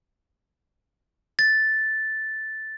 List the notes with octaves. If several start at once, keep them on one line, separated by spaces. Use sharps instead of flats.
A6